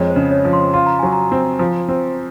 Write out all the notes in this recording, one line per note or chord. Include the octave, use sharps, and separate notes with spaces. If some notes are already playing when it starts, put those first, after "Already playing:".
Already playing: F2 G#3 C#5 D#5
C5
C#3
C#5
F3
C6
F4 C6
A#5
F#3 G#5
A#5
C4
F3
C4